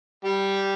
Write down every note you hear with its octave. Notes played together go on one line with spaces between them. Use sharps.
G3 G4